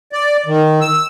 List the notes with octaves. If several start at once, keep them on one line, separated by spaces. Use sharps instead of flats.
D5
D#3
E6